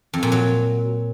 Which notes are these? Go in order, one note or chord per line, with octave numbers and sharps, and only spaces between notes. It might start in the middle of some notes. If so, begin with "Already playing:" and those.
F2
A#2
F#3